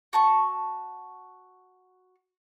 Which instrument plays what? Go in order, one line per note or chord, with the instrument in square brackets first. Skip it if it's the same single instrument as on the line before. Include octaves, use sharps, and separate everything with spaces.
[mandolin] F#4 A5 C#6